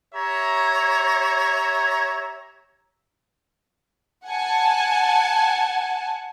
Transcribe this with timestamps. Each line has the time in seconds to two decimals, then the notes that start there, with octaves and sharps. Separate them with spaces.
0.14 G4 C#5 E5 A#5
4.26 F#5 G#5 A5